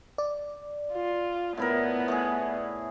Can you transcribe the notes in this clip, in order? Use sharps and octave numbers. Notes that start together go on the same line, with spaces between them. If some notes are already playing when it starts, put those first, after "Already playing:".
D5
F4
A2 B3 E4 A#4
A2 G#4